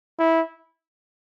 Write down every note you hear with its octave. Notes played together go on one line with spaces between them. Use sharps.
E4